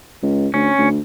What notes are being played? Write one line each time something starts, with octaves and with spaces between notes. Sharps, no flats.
C#2
D2 C#4
D2